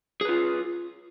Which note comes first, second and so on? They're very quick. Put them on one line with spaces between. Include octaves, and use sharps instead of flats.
G#4 B4 F4